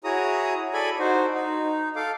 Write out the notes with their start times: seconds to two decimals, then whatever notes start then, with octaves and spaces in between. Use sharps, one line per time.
0.04 E4 F#4 G#4 C#5 A#5 D#6
0.74 A4 D5 G#5 B5
0.99 D#4 F#4 C5
1.34 D#4
1.96 A4 F5 D6